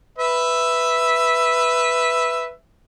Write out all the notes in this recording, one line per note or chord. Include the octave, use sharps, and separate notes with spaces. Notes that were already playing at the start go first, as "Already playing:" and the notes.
B4 E5